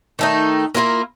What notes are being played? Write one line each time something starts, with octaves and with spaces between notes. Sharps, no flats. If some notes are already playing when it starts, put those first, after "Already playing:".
D#3 A3 D#4
A#3 E4 F4 A#4